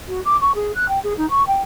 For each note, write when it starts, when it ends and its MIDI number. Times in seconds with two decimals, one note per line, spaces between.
0.08 0.20 66
0.25 0.36 86
0.41 0.52 85
0.55 0.74 68
0.74 0.86 90
0.88 0.99 79
1.03 1.13 68
1.17 1.29 63
1.30 1.45 85
1.47 1.61 79